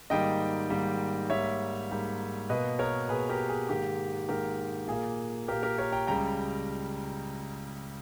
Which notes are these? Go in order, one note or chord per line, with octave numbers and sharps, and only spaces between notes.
G#2 D#3 G3 A#3 D#5 G5
G#2 D#3 G3 A#3
G#2 G3 A#3 C#5 E5
G#2 G3 A#3
B2 A#3 B4 D#5
A#4 C#5
B2 A#3 G#4 B4
G4 A#4
G#4
G#2 D#3 A#3 G4
G#2 D#3 A#3 G4 A#4
A#2 A#3 G#4
A#2 A#3 G4 A#4
G4 A#4
A#4 C#5
G5 A#5
C#2 C#3 G3 G5 A#5